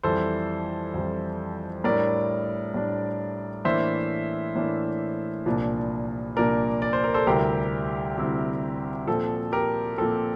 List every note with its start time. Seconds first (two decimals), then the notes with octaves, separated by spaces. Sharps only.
0.03 F2 E3 G3 A4 C5
0.94 F2 E3 G3
1.84 A2 G3 D4 A#4 D5
2.74 A2 G3 D4
3.65 A2 E3 A#3 D4 C5 E5
4.56 A2 E3 A#3 D4
5.46 C2 A#2 F3 A#3 D4
6.36 C2 A#2 F3 A#3 D4 A#4 D5
6.82 D5
6.93 C5
7.04 A#4
7.14 A4 C5
7.27 D2 C3 G3 C4 E4 G4 A#4
8.17 D2 C3 G3 C4 E4
9.07 A#2 F3 C4 A4
9.52 G4 A#4
9.98 A#2 F3 C4 A4